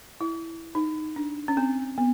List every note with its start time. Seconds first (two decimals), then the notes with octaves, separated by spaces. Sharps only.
0.21 E4
0.75 D#4
1.16 D4
1.48 C#4
1.57 C4
1.98 B3